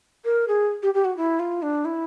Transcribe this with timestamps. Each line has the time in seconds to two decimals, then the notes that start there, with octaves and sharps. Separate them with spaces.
0.25 A#4
0.48 G#4
0.83 G4
0.94 G4
1.05 F#4
1.17 E4
1.40 F4
1.62 D4
1.85 E4